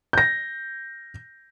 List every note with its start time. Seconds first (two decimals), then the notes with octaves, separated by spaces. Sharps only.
0.13 G6 A#6